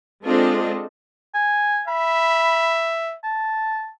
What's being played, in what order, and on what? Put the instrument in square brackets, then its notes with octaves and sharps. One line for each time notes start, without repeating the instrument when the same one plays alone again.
[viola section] G#3 C4 D4 F4 A4 D#5
[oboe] G#5
[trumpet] E5 [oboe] B5
[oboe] A5